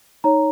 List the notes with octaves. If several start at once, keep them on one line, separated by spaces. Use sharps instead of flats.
D#4 C#5 A#5